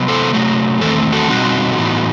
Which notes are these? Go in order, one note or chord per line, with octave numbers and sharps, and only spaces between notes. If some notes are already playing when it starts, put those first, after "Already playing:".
Already playing: C3 F#3 B3
A4 C5
C3 F#3 A3
E2 D#3 A3 C4 A4 C5
F#4 A4
B2 G3 C4 D#4 F#4
A2 E3 B3